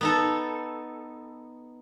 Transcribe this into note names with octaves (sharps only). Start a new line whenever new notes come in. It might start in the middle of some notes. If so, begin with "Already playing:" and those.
B3 D#4 A4